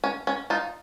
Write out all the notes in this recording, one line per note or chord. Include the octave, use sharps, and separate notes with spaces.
C#4
C#4
D#4 F4